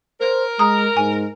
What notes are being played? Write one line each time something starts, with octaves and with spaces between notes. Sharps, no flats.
A#4 C5
G#3 A#5 D#6
G#2 G#5